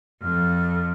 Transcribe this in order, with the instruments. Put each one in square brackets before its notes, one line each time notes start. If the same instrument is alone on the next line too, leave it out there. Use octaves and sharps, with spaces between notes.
[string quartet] F2 [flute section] A4 F6